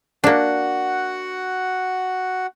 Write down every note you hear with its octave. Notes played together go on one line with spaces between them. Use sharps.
A#3 D4 F#4 F#5